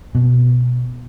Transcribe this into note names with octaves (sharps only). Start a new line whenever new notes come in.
B2